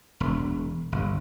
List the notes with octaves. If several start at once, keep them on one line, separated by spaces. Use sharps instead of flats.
E1
G1